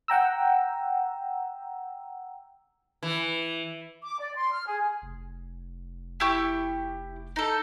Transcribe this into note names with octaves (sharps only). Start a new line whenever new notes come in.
F#5 G5 A#5 E6
E3
D6
D5
C6
F6
G#4
F1
E4 G4 C#6
D#4 A4